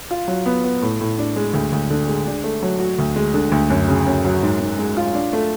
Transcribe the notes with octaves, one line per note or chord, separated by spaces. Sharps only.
F4
F#3
B3
B3
A2
A2
D4
G#3
D2
D2
D3
G#3
D4
A3
F#3
F#4
D2
G#3
D3
D2
F#2
C#3
F#2
F#3
G#2
G#2
G#3
F4
D4
A3